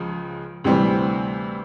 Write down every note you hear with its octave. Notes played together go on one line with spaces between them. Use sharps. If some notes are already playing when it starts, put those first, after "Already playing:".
Already playing: C#2 C#3 F3 G#3
D2 C3 E3 G3 C4